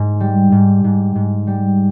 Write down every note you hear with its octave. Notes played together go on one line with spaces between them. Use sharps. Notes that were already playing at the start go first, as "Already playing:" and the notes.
Already playing: G#2
G3
G#2
G#2
G#2
G3